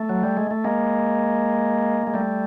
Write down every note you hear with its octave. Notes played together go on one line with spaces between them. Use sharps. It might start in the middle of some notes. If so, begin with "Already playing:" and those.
Already playing: A3
F#3
G3
G#3
A3
G#3 A#3
G#3
G3 A3